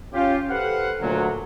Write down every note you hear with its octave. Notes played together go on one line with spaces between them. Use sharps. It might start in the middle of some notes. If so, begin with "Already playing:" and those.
C#4 F4 G4
G4 A4 B4 C5 F5 F#5
D2 A#2 D3 F#3